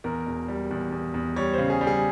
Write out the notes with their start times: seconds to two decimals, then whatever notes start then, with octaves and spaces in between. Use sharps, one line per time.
0.04 E2 A#4
0.27 E1
0.48 G3
0.71 E2
0.92 E2
1.14 E2
1.36 G3 C#5
1.53 C#3 C5
1.70 G#4
1.81 G3
1.87 G#4